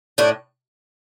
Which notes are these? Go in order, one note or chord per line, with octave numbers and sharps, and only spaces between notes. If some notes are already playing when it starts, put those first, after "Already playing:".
A2 D4